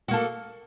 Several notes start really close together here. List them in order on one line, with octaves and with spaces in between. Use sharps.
F#4 A#3 A4